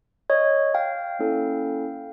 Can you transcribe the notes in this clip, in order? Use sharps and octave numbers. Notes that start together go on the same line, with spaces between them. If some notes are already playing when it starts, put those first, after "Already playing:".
C#5 D#5
F5 G5
A#3 C#4 E4 A4